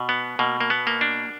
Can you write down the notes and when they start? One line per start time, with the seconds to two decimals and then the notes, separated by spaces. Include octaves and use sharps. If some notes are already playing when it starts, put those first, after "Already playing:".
Already playing: B2
0.09 B3
0.39 B2 A#3
0.60 A#3
0.70 B3
0.87 A#3
1.01 D4